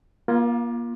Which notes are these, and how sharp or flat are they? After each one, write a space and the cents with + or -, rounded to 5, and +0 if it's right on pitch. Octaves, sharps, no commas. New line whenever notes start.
A#3 +30 F4 -5